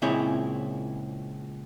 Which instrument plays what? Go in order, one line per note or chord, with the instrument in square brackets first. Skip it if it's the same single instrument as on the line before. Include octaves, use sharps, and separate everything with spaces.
[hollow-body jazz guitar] C#2 A#2 C4 E4 G#4 C#5